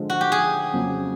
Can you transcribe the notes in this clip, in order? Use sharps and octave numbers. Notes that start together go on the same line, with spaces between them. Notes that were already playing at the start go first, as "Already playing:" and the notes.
Already playing: D3 F3 G#3
F#4
G4
G#4
F2 C#3 F#3 A#3